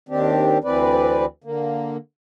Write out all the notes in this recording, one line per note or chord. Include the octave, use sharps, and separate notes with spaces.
D#2 D#3 C4 D4 G4
D2 E3 C4 B4 D5
D3 A#3